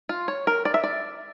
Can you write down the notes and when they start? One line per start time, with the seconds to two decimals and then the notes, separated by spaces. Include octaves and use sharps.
0.09 F4
0.28 C#5
0.47 A#4
0.65 D5
0.74 E5
0.84 D5